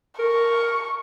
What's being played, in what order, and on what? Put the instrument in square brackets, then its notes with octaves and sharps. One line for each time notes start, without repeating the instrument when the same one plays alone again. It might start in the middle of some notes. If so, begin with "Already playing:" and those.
[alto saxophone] A#4 [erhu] C#6